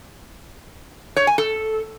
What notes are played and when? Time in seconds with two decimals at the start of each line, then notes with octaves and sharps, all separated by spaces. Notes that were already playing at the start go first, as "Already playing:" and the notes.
1.16 C#5
1.27 G#5
1.38 A4